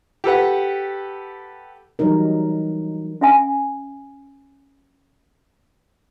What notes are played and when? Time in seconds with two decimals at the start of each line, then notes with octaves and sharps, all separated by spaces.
0.24 G4 A4 B4 F#5
1.99 E3 F#3 G3 D#4 A#4
3.21 C#4 E5 F#5 G#5